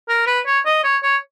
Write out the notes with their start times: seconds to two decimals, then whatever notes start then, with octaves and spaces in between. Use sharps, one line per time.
0.09 A#4
0.27 B4
0.46 C#5
0.65 D#5
0.84 C#5
1.03 C#5